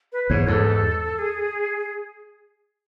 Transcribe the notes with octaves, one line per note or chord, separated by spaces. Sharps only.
B4
E2 G#2 C#5
E2 G#2 A4
G#4